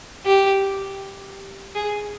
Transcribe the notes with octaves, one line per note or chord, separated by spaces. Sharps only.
G4
G#4